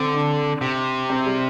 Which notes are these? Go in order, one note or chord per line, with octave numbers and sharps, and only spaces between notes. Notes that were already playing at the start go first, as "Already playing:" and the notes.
Already playing: D3 C4
D4
C3
C4
G3